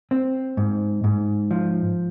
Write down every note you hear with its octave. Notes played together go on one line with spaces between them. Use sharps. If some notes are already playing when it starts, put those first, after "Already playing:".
C4
G#2
G#2
F3